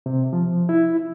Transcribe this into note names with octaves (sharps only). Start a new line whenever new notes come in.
C3
F3
E4